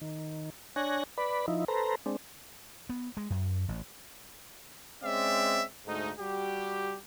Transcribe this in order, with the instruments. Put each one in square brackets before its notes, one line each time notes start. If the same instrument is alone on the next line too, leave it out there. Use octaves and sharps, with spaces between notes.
[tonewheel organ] D#3
D4 C#5 G#5 F#6 A#6
B4 D5 B5
F3 D#4 E4
A4 B4 C5 A#5
G#3 C4 D4
[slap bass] B3
G#3
F#2
A1
[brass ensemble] G#3 C4 C#4 D5 E5
D2 G#2 A3 D#4
G3 F#4 G4